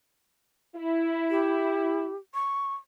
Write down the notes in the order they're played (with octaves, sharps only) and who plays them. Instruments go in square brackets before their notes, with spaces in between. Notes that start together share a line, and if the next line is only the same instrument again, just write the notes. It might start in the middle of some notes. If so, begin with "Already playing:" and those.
[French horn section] E4
[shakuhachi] G4
C#6